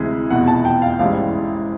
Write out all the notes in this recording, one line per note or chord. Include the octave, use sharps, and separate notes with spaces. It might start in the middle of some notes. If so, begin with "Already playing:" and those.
Already playing: D2 C3 E3 G#3
F1 E2 B2 F#5
A5
G5
F5
A1 G#2 E3 G3 F5